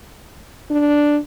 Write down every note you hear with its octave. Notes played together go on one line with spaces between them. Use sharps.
D4